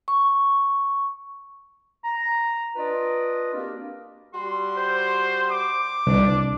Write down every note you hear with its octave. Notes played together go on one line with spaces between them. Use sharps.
C#6
A#5
D4 F4 B4 D5 D#5
A#3 C4 D4 F#4 G4 A#4
G3 F#4 C6
C5
D6
C2 D4